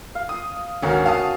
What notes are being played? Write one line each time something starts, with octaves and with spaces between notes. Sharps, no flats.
F5
D#6
G#1 D2 C#4 F#4 A#4
F5 A5 D#6